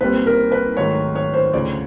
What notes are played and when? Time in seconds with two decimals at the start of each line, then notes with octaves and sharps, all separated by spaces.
0.01 C2 A#2 G3 C4 B4
0.26 A#4
0.52 B4
0.77 G#2 D#3 F#3 A3 C#5
1.15 C#5
1.34 C5
1.53 D2 C#3 F3 D5